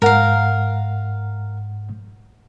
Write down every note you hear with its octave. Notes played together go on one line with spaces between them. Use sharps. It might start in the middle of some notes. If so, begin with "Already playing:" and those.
G#2 A#4 F5 F#5